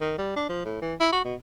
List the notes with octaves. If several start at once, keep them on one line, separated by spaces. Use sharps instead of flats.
D#3
G3
D4
F3
A2
E3
E4
F#4
B2